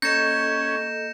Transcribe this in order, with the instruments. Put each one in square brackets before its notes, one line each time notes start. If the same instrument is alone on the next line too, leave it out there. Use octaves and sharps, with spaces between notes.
[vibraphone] A#3 A4 D#5 [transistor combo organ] C#4 [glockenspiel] G6 [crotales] A#6 C#7 E7